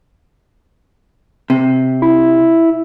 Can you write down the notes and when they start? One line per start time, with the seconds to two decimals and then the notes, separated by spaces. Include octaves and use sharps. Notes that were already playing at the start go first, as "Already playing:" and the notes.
1.50 C3
2.02 E4